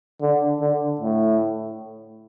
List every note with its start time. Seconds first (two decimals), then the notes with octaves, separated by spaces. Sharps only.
0.22 D3
0.61 D3
1.01 A2